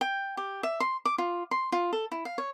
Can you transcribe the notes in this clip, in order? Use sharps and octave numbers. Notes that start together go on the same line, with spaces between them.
G5
G4
E5
C6
D6
F4
C6
F4
A4
E4
F5
C#5